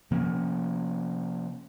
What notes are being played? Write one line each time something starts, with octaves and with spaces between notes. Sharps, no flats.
C3 F3 A#3 C#4